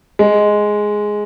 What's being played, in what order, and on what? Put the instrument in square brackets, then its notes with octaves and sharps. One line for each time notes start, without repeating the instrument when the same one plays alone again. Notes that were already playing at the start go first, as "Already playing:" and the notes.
[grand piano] G#3